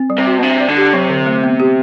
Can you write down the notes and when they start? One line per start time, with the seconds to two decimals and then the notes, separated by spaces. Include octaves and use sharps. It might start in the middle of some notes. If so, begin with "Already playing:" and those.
Already playing: C4
0.10 G3
0.18 C3
0.27 F#4
0.39 B2
0.43 C3 D4
0.60 D5
0.68 D3
0.77 G4
0.93 C3 F#3
1.09 D3
1.26 A3
1.44 B3
1.60 G4